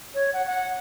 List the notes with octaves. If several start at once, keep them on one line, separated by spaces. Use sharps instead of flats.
C#5
F#5
F#5